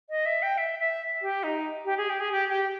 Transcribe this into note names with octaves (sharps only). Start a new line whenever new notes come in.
D#5
E5
G5
E5
E5
G4
D#4
G4
G#4
G4
G#4
G4
G4